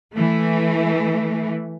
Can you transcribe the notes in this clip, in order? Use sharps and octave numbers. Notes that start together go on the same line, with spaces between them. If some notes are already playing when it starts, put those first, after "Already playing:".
E3 A3